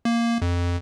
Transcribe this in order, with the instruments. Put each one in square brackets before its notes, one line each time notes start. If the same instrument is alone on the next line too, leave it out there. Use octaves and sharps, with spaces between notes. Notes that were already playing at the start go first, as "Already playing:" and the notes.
[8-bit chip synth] A#3
F2